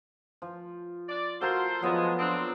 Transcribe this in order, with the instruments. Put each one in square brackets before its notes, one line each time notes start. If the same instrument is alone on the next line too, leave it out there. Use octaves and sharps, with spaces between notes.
[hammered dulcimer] F3
[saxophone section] D5
[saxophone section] F4 C5 [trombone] F#4 [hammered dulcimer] A4 A#4
[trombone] F3 [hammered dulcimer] F#3 B3 F4 [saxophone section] G#3
[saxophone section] C4 D4